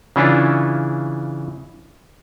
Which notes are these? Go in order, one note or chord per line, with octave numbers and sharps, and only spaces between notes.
C#3 E3 C#4 D4 E4 F4